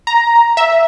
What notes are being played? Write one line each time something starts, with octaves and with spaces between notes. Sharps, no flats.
A#5
E5